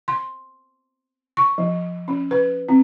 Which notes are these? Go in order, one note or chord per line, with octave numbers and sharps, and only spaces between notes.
C6
C#6
F3
C#4
B4
C4